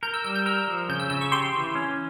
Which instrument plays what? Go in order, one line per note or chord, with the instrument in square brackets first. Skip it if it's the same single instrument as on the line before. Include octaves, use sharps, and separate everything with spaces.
[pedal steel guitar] A#4 [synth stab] G6
[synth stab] E6
[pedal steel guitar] G3 [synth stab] E6
[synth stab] G6
[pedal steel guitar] A#4 [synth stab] E6
[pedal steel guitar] F3
[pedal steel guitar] C#3 [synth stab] G6
[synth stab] E6
[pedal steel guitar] C#3 [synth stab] E6
[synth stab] C#6
[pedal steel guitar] G4 [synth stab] C6
[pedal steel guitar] E3
C#4